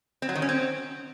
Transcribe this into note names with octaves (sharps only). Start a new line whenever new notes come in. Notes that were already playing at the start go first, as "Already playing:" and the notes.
C4
F#3
D#3
C#4
C4